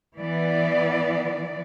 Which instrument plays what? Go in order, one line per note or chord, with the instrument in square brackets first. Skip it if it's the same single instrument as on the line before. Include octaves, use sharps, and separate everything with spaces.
[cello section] E3 B3 D5